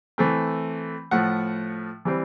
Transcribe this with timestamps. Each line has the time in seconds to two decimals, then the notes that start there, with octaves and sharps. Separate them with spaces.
0.18 E3 A3 C4
1.11 A2 F3 A3 F#5
2.05 E3 G3 C4